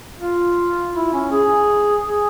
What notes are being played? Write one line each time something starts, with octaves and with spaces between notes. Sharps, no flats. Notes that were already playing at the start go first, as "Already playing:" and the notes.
F4
E4
C#4
G#4
G#4